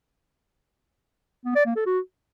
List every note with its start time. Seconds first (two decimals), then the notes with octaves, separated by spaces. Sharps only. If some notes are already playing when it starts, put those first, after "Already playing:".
1.45 B3
1.55 D5
1.66 A#3
1.76 A4
1.86 F#4